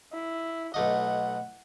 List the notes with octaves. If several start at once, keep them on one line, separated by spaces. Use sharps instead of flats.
E4
B1 A3 D#5 F#5